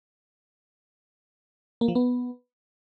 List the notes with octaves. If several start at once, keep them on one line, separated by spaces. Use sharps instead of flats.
A#3
F3
B3